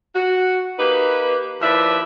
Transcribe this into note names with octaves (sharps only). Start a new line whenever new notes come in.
F#4
A#3 D#4 G4 B4
D#2 F3 E4 B4 D5 E5